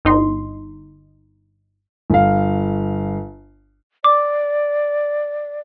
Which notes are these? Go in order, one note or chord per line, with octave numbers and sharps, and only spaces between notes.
G1 D#4 C6
G1 F5
D5 D6